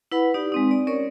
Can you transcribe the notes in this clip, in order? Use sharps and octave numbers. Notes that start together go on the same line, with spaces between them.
E4 B4 F#5 B5
D#4 G4 D5
G#3 C4 D#4
D5
C#4 A#4 C#5 D5 C#6